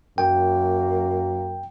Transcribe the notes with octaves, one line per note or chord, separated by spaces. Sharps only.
F#2 A#3 G5